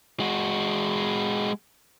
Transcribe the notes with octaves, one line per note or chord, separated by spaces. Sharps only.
G#3 F#4